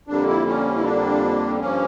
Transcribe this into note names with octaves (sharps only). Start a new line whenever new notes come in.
F2 D3 G3 A#3 D4
E4
C#4
E4
D4
G2 F3 A#3 C#4